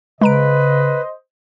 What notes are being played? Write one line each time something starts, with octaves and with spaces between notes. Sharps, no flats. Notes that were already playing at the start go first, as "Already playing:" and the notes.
C#3 G#3 B4 C5 D#5 A#5 D7